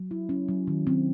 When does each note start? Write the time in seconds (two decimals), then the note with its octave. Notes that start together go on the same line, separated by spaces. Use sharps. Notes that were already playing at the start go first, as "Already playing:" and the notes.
Already playing: F#3
0.11 E4
0.29 C#4
0.49 F#3
0.68 D#3
0.87 C4